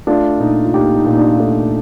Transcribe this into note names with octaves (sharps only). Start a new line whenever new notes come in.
A3 D4 F4
A#2 D#4
F4
A#2 D#4 G4
D#4
A#2
D#4
D4
F4
A3 D#4